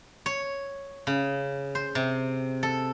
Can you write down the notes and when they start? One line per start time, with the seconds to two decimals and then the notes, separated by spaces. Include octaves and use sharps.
0.26 C#5
1.07 C#3
1.75 C5
1.95 C3
2.63 A4